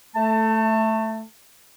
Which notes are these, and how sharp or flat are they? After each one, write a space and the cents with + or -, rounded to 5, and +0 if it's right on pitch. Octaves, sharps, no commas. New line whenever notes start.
A3 +0 A5 +25